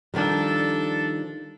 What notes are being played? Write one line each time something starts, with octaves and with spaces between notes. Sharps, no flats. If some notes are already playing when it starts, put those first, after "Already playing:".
D#3 F3 G3 D4 A4